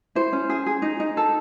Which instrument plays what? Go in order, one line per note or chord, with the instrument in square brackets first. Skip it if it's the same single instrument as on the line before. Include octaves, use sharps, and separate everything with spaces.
[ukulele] E4 C5
C#4
G#4
G#4
D#4
D#4
A4